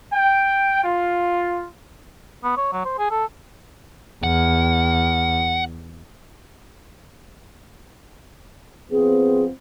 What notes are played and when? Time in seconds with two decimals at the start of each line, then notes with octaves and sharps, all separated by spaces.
0.13 G5
0.83 F4
2.44 B3
2.57 C#5
2.73 F#3
2.85 C5
2.99 G#4
3.11 A4
4.24 E2 F#5
8.91 F3 B3 C4 G#4